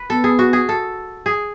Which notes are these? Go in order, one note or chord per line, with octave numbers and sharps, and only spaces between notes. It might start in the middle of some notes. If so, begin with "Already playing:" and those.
Already playing: B4
B3 A4
G#4
F#4
G#4
A4
G#4